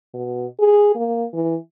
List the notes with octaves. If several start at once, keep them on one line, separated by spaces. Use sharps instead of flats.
B2
G#4
A#3
E3